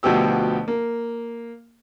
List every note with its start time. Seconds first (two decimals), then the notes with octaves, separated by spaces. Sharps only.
0.03 D2 B2 F3 G4 E6
0.68 A#3